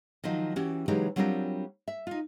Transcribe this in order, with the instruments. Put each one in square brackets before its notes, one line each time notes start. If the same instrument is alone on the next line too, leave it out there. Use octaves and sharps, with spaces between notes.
[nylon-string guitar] D#3 F3 F#3 D#4
E3 C#4 F#4 G4
C#3 E3 F#3 G#3 D#4 G4
F#3 G3 C4 D4 F4 A#4
E5
D#4 F4